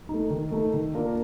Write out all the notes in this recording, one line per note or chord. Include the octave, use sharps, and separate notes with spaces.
A3 D#4
D#3
A3 D#4
D#3
A#3 D4 F4 A#4